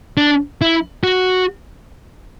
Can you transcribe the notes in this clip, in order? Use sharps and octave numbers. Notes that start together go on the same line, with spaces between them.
D4
E4
F#4